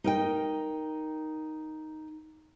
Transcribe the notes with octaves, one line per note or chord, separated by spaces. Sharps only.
D#4 A#4 G5